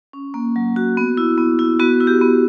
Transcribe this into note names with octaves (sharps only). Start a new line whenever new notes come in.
C#4
A#3
F#3
F#4
B3
E4
B3
E4
B3 F#4
E4
G4
B3